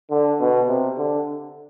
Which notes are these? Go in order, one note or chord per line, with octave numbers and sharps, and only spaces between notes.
D3
B2
C3
D3